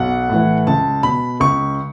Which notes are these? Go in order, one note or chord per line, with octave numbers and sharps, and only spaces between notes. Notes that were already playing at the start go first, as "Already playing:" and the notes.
Already playing: B1 F#5
A2 E3
C#2 A5
B2 B5
C#2 C#6